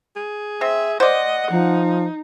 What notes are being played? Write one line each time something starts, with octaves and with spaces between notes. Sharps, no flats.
G#4
C4 E5
C5 D5 D#5 F#5
F3 D#4